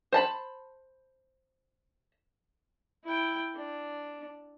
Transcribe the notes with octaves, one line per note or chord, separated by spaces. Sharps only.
C5 A5 B5
E4 G5
D4